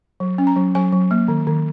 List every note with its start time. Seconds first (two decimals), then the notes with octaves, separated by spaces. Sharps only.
0.20 F#3
0.38 C#4
0.47 A#5
0.56 F#3
0.75 F#3 G#5
0.92 F#3
1.11 A#3
1.28 D#3
1.47 D#3